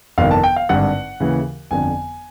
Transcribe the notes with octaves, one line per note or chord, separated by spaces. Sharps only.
G1 F2 C3 D#3 F5
A5
G5
F5
G#1 G2 D3 F#5
D#2 C#3 E3
G1 F2 D3 G#5